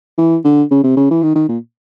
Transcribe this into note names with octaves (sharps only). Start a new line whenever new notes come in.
E3
D3
C#3
C3
C#3
E3
D#3
D#3
A#2